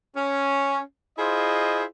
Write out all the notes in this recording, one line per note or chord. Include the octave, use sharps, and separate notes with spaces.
C#4
E4 F4 G#4 C5 D#5